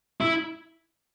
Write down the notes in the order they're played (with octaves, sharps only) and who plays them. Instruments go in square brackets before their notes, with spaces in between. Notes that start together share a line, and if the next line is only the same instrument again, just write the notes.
[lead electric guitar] E4